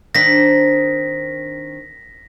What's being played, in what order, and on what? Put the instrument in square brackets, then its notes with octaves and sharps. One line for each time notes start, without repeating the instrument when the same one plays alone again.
[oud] D#3 C4 D4 [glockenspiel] A#6 B6